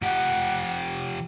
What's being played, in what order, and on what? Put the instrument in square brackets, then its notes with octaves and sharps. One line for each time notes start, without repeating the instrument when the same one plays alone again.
[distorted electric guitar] F3 G4 [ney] F#5